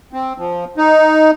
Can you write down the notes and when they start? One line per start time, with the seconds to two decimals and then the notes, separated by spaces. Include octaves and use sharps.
0.13 C4
0.38 F3
0.77 D#4